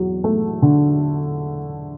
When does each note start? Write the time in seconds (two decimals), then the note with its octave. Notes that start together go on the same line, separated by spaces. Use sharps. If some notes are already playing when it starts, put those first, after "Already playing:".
Already playing: E2 F#3
0.24 A3
0.62 D3